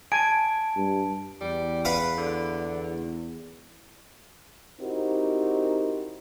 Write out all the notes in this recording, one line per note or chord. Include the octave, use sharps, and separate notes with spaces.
G#5 A5 D7
G2
E2 G3
B4 F5 F#5
D3
C4 D#4 E4 F#4 G4 A#4